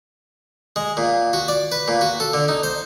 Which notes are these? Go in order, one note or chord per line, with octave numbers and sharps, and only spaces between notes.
G#3
A#2
F#4
D5
B4
A#2
F#4
A4
D3
D#4
C5